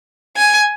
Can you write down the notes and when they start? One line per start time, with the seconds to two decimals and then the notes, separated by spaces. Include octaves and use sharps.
0.37 G#5